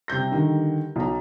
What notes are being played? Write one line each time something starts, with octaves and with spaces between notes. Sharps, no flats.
C3 G3 G6 A#6
D3 D#3 G3
B1 A#5